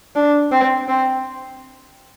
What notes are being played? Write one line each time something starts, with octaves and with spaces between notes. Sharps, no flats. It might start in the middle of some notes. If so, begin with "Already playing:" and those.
D4
C4
C4